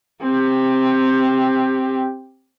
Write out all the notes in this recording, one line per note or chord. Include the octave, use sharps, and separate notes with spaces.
C4 G4